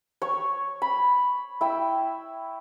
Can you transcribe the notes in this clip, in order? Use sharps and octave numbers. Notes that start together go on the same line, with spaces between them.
C#5 C#6
B5
E4 G5 E6